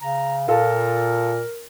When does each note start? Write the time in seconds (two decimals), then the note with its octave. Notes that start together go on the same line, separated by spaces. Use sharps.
0.02 C#3 A#5
0.48 A#2 F4 A4 A#4 F5